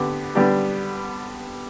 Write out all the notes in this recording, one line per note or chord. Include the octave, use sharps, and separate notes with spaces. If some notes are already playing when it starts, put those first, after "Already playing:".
Already playing: D3 B3 G4
D3 G3 B3 D4 G4